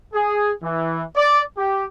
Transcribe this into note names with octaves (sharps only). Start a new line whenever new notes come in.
G#4
E3
D5
G4